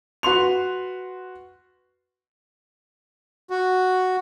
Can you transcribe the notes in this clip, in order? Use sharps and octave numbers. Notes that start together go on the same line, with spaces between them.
F#4 B4 C6 F7
F#4